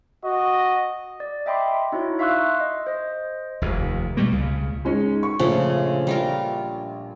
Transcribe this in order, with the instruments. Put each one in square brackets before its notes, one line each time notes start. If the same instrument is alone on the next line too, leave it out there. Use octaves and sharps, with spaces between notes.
[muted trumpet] F#4 [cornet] D#5
[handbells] D5
D#5 E5 G5 B5 C6 D6
D#4 E4 F#4 C#5
E5 F5 C6 C#6 E6 F#6
D#5
C5 D#5
[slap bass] F1 D#2
B2 G3 A3 A#3
C#2 C#3
[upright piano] G#3 C#4 D#4
C#6
[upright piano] A#1 [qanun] C#3 F3 A3
[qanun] G3 F4 A#4